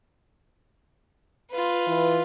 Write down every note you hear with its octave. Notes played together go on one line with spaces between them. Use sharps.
F4 B4
E3